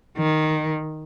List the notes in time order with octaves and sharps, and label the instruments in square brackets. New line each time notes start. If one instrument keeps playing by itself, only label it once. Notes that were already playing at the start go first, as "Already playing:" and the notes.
[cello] D#3